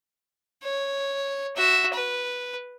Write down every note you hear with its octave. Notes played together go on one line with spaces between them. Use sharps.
C#5
F#4 E5
B4